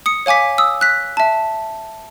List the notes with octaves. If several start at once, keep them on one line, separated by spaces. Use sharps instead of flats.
D#6 C#7
C#5 F5 G#5 D6 B6
D#6 E6
F#6 B6
E5 A5